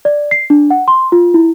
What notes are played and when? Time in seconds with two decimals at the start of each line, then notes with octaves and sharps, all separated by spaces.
0.05 D5
0.31 C7
0.50 D4
0.70 F#5
0.88 C6
1.12 F4
1.34 E4